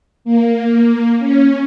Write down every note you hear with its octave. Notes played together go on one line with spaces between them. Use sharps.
A#3
C#4